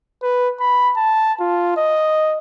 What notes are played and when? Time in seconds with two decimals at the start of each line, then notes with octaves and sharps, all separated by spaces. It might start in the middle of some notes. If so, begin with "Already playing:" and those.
0.23 B4
0.60 B5
0.96 A5
1.41 F4
1.77 D#5